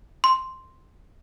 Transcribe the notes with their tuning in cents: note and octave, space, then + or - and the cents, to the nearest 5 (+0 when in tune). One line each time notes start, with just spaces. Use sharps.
C6 +0